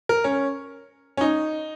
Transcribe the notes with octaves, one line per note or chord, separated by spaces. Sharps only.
A#4
C#4
C#4
D#4